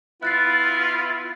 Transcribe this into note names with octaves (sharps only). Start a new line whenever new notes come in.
B3 E4 F4 F#6 A6 C7